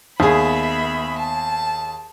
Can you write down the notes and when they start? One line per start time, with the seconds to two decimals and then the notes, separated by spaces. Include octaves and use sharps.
0.20 D#2 B3 G#4 E5 B5
1.19 A5